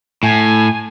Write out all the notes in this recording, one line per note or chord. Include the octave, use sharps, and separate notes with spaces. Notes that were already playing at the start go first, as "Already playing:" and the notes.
A2 G#5